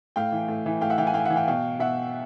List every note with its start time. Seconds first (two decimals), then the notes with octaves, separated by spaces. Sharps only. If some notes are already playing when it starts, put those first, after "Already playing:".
0.16 A2 F5 G5
0.32 E3
0.49 A2
0.66 E3
0.81 A2 F5 G5
0.90 E5 F#5
0.98 E3 F5 G5
1.07 F#5 G#5
1.14 A2 F5 G5
1.25 E3 E5 F#5
1.36 F5 G5
1.48 B2 F5 G5
1.79 B2 E5 F#5